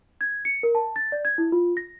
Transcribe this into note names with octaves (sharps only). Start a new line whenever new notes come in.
G#6
C#7
A#4
A5
A6
D5
G#6
E4
F4
A#6